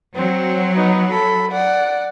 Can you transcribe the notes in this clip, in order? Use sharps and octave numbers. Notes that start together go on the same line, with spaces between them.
F#3 C4
B3 D#4
A4 B5
D5 F#5